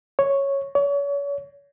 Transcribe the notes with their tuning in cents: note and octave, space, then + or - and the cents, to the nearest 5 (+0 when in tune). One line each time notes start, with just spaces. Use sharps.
C#5 -5
C#5 +35